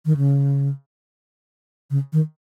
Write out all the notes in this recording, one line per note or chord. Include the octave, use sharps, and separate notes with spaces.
D#3
C#3
C#3
D#3